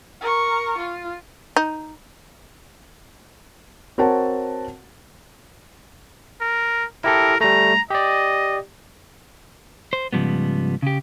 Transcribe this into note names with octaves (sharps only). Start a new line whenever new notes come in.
A#4 C#6
F4
D#4
C4 F#4 A#4 C#5 F#5 A5
A#4
E4 G4 A4 A#4
G3 A3 A#5
G4 D5 D#5
C5
G#2 C#3 F3 G3 B3
C#3 G4